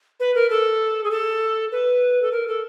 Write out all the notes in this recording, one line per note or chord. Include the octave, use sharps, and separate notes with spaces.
B4
A#4
A4
G#4
A4
B4
A4
A#4
A4